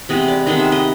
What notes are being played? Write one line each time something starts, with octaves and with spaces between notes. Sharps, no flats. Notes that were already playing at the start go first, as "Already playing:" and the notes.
C3 E3 G#3 B3 D#5
D5
C3 D#3 G#3 B3 D#5
E5
D#5